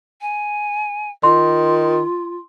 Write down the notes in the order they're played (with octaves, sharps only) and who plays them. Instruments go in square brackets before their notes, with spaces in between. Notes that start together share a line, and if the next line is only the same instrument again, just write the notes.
[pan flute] G#5
[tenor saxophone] D#3 [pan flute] F4 [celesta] C6